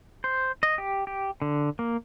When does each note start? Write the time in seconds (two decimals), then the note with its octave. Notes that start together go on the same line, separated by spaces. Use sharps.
0.24 C5
0.63 D#5
0.78 G4
1.07 G4
1.42 D3
1.79 A#3